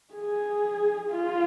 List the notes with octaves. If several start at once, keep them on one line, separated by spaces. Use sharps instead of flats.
G#4
F4